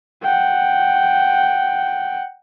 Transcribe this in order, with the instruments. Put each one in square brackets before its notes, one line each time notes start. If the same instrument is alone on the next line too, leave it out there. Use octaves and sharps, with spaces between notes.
[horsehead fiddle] F#5 G5